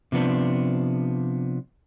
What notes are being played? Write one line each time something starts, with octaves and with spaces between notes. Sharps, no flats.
C3 F3 B3 D4